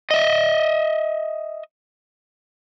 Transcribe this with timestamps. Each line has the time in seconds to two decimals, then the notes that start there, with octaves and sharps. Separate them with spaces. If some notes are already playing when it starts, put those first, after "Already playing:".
0.11 D#5 E5